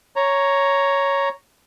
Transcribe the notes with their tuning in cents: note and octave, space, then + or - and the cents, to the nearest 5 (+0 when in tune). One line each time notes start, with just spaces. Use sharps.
C#5 +0 A#5 +0